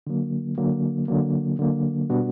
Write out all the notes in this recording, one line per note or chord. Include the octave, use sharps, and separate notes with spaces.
D3 F#3 A#3
D3 F#3 A#3
D3 F#3 A#3
D3 F#3 A#3
B2 G3 B3 D4 F#4